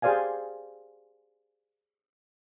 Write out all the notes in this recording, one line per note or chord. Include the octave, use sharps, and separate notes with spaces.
G4 G#4 C5 D5 F5 G#5